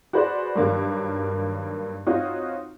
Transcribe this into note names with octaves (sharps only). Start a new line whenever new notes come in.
F#4 G#4 B4 C5 D5
G2 D#3 F#3 A#3
C4 D#4 F4 F#4 C#5